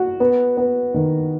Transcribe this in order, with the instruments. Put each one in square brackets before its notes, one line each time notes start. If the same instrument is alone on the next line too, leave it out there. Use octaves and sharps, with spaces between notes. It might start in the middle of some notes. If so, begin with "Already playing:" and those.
Already playing: [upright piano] F#4
B3
B3
D#3